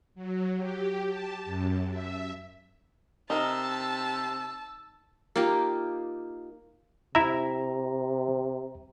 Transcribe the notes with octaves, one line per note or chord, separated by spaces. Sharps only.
F#3
G4
A5
F#2
E5
C3 D#4 A#4 A5 E6
A#3 D#4 F4 G4
C3 E4 E5 A#5